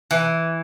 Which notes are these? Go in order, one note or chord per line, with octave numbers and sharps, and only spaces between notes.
E3